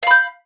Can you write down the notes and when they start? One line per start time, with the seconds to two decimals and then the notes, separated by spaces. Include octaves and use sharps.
0.03 F5
0.07 B5
0.11 G6